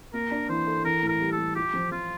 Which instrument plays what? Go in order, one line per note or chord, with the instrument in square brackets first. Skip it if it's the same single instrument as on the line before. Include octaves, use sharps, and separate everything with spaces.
[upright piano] A#3 [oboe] A#4
[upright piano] D4
[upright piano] E3 [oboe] C5
[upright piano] A4
[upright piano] E3 [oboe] A#4
[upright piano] A2
[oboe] A#4
[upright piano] G3
[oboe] A4
[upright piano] G3
[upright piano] F4 [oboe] G4
[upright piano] F3
[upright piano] F3 [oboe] F4